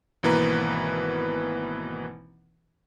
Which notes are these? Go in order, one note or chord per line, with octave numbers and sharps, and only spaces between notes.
G#1 B2 E3 A#3 B4 A#5